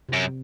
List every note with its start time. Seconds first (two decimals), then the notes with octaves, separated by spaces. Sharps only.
0.09 F#2 C3